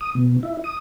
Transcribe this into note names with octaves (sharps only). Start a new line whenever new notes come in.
D#6
B2
E4
D#6